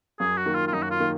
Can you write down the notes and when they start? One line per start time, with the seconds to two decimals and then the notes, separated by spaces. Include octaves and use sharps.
0.20 F#2 G#4
0.37 F#4
0.46 D#3 A#3
0.55 F4
0.68 F4
0.73 F#2 D#4
0.83 F#4
0.91 F4
1.00 D#3 A#3